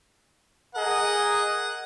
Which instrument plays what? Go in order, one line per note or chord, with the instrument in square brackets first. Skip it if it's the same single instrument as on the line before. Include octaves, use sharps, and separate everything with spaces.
[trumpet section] G#4 A#4 D#5 [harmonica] F#5